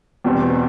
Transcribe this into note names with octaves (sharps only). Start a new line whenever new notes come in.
E2 B2 G3 C4